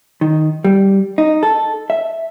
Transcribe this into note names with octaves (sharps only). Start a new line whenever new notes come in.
D#3
G3
D#4
A4
E5